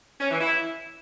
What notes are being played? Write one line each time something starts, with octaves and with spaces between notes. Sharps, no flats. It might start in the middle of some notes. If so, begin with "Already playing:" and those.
C#4
E3
E4